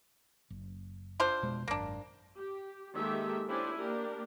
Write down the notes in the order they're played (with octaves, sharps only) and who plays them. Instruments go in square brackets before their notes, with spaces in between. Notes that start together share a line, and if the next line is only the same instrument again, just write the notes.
[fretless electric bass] F#1
[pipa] D4 F4 C5
[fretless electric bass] F1 B2 G#3
[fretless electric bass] G#1 F#2 [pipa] A#3 D4
[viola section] G4
D#3 G#3 A#3 G4 A4 E5
C#4 D4 E4 G4 C5 G#5
A#3 D4 G4 A#4